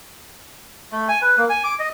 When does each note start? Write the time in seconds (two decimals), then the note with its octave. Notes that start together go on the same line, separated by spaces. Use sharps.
0.92 A3
1.08 G#5
1.22 B4
1.38 A#3
1.49 G#5
1.64 D6
1.79 D#5